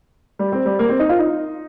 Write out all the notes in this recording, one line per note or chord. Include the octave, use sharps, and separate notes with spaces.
G3
C4
G3
A#3
C4
D#4
F4
D#4